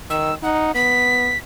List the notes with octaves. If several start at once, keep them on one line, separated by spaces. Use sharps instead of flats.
D#3 E6
D#4 F#5
B3 B6